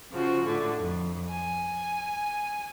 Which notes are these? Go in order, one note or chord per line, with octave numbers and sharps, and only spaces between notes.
C#3 F3 F#4
A2 D3
F2
G#5